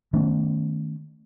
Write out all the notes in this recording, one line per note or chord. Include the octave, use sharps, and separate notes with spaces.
D#3 A3 B3 C#4